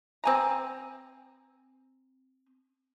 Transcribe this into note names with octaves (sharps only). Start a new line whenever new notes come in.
C4 G#5 A#5